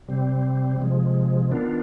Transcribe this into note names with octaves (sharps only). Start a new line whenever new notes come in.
C3 G3 C4
C3 F3 G#3
D#3 B3 D4 F4